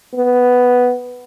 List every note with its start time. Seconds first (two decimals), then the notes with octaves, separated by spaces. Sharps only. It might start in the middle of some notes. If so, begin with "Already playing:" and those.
0.15 B3